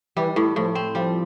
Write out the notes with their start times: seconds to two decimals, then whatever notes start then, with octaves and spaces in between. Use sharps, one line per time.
0.16 E3 G3
0.36 A2
0.56 A2 F3
0.75 C4
0.95 F3 G3